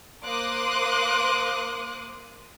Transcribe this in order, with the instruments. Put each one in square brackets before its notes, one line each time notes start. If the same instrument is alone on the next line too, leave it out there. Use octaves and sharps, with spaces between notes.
[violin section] A#3 C5 C6 D6 D#6 F#6